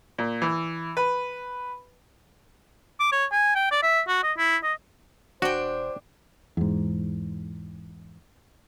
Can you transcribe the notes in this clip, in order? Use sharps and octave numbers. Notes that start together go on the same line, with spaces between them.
A#2
E3
B4
D6
C#5
G#5
G5
D5
E5
F#4
D#5
E4
D#5
E1 D4 F#4 C5 G5
E2 G#2